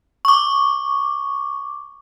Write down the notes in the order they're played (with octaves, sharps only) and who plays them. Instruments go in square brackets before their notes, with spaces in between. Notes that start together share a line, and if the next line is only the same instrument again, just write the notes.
[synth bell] C#6 D6